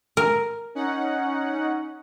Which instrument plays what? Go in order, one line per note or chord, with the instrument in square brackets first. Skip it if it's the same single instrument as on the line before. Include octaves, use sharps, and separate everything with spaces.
[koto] A#4
[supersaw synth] C#4 D#4 F#5